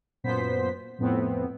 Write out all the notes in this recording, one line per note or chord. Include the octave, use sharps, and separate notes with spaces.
F#2 A#2 B3 C5 B6
F2 A2 B3 C4